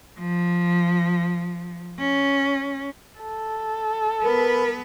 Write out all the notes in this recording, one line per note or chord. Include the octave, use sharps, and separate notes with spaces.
F3
C#4
A4
B3 A#4 B4